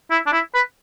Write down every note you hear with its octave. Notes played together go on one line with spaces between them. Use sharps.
E4
D4
E4
B4